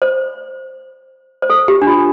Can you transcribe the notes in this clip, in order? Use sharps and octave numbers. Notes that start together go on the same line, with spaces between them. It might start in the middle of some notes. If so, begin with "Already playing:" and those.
C5
C5
A4
G4
D4
F4